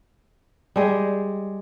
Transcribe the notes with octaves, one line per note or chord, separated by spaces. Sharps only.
G3 G#3 G#4